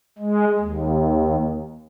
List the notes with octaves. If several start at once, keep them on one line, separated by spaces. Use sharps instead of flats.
G#3
D#2